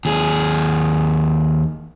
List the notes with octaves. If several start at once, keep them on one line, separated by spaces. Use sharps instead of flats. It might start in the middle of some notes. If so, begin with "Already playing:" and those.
D#2 G#4